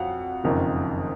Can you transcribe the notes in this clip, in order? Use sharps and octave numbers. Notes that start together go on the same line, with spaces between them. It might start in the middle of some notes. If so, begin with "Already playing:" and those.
Already playing: F2 F#3 F5 F#5
F#1 F2 D#3